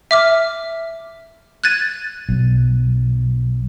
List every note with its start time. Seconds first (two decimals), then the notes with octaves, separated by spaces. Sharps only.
0.11 E5 D6 F6
1.64 F#6 G#6 A6 D#7
2.29 B1